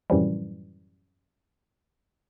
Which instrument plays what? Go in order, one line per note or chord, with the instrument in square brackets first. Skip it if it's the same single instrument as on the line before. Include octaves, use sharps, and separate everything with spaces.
[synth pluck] F#2 A2 C3 E3 F3 G3